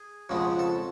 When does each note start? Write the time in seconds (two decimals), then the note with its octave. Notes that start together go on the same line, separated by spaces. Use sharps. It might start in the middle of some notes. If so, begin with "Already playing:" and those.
Already playing: G#4
0.29 F2 C#3 F3 G#3 B3
0.59 A4